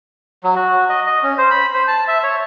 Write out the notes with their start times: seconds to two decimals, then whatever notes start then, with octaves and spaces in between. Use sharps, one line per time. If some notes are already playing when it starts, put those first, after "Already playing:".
0.44 F#3
0.56 F#4
0.89 D#5
1.06 D#5
1.23 C#4
1.38 C5
1.51 B5
1.74 C5
1.88 A5
2.08 E5
2.23 C#5